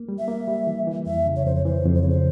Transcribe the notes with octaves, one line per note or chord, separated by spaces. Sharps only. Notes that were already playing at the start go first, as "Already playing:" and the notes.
Already playing: A#3
G3
E5
A#3
G3
E3
E3
F2 E5
C#3
C#5
F2 C5
C#5
E3 C5
F2
C5
C#3 C#5
C5